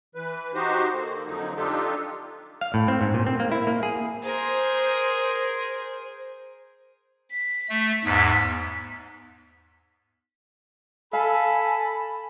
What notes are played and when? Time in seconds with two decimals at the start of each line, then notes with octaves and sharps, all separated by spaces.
0.15 E3 B4
0.54 D#4 F#4 G4 C5
0.93 D3 A#3
1.27 F2 D3 F3 F#3 D#4
1.57 D4 D#4 F4 G4 A4
2.61 F5
2.74 A2
2.88 C4
3.01 G#2
3.14 A#2
3.26 C4
3.40 A#3
3.52 E4
3.67 A#3
3.83 G#4
4.23 G#4 A#4 C5
7.32 B6
7.70 A3
8.05 E2 G#2 B6
11.13 A4 F5 G#5 B5